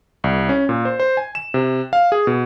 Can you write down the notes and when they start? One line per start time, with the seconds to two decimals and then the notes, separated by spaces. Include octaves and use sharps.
0.24 C2
0.49 C#4
0.69 A#2
0.85 C5
1.00 C5
1.17 G#5
1.35 E7
1.54 C3
1.93 F5
2.12 G#4
2.27 B2